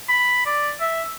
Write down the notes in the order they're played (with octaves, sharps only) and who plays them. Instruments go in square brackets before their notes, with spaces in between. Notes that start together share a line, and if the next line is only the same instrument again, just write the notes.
[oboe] B5
D5
E5